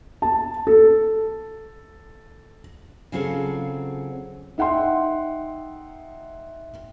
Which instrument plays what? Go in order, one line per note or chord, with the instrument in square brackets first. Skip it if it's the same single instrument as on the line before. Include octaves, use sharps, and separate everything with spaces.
[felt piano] A5
A4
[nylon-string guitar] C#3 F#3 C4 F4 G#4 A4
[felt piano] D#4 E5 F#5 G5 C6